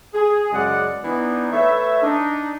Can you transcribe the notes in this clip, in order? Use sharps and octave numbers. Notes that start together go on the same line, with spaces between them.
G#4
F#2 C#3 G#3 G#4 D5 F#5
E3 B3 D4 D#4
A3 B4 C#5 E5
D4 D#4